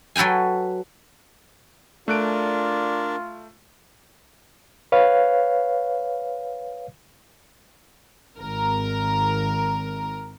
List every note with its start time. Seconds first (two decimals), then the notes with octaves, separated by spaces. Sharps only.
0.16 F#3 A4 B4 G5 G#5
2.08 A3 D4 F4 A#4 D5 F#6 D7
4.92 B4 C#5 F5
8.37 G#1 A#4